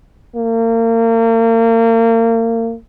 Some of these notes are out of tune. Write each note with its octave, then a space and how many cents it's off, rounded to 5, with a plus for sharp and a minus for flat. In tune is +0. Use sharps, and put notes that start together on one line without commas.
A#3 -35